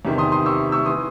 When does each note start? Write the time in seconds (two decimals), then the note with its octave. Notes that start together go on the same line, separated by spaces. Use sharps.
0.05 E2 C3 D#3
0.18 C6 D#6
0.32 C6 D#6
0.46 C#6 E6
0.72 C#6 E6
0.86 E3 C6 D#6